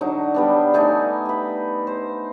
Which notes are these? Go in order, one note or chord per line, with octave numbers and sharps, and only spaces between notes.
D3 F#3 D#4
G3 B3 D4
A3 D#4 D5 G#5
G5 B5
C5